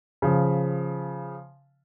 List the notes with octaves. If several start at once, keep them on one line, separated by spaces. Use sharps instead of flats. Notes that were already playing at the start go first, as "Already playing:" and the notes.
C#3 F3